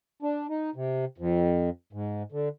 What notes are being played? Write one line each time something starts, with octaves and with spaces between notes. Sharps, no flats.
D4
D#4
C3
F2
G#2
D3